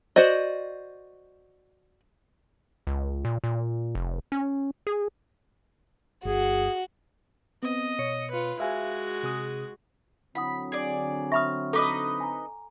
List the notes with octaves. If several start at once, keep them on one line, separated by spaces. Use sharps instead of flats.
F#4 C5 D5 D#5
C#2
A#2
A#2
F1
C#4
G#4
G1 F#4 G#4
B3 C4 D#5
B2 C#5 C#7
F4 B4
G#3 F#4 E5 F5 G#5
C3 G#4 D#6
D3 F#3 C4 E4 F#5 B5 D#6
G#4 D5
E5 B5 C#6 D#6 F6
D#4 A4 B4 D#5 D6
G#5 A#5